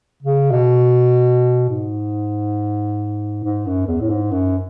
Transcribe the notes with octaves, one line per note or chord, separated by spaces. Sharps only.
C#3
B2
G#2
G#2
F#2
E2
A2
G#2
F#2